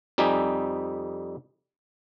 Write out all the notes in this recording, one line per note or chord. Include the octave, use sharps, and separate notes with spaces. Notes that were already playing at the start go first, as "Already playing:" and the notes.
F2 G3 D#4 G4 G#5